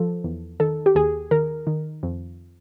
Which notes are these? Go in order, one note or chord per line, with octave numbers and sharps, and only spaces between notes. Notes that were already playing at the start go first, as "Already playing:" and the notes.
Already playing: F3 A4
E2
D#3 A4
G4
D#2 G#4
D#3 A#4
D#3
F2